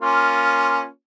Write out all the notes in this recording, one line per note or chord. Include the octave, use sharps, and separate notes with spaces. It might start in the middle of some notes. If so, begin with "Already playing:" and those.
A#3 C#4 F4